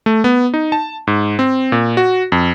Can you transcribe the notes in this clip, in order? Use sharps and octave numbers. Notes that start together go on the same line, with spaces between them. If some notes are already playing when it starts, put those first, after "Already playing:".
A3
B3
D#4
A5
G#2
C4
A#2
F#4
F2